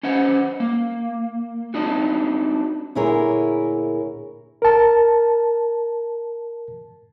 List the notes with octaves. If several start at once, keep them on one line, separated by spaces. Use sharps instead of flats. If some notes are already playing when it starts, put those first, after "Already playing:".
C#4 C5 D#5 F#5
A#3
C4 D4 D#4 F#4
D2 A#2 E4 G#4 A#4 C#5
A#4 A5